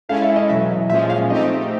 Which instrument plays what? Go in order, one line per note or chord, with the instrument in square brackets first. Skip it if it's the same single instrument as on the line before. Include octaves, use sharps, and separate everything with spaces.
[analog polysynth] G#3 C#4 E4 A4 [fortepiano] F5
[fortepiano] E5
D#5
[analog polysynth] E2 B2 F#3 [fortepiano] E5
[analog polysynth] A#2 F3 G#3 C#4 [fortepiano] E5
[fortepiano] F5
[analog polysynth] A3 C4 D#4 G4 [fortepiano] D#5